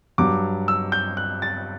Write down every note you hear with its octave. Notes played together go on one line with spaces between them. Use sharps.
G2 F#3 D6
E6
G6
F#6
A6